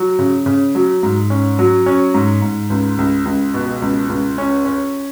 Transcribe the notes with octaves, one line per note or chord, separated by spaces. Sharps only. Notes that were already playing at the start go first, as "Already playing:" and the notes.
Already playing: F#3
C#3
C#3
F#3
G#2
C#4
F#3
C#4
G#2
G#2
C#2
C#2
C#2
B2
C#2
C#2
C#4
C#4